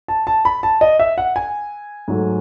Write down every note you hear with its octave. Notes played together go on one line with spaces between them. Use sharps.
A5
A5
B5
A5
D#5
E5
F#5
G#5
G#2 F#3 A3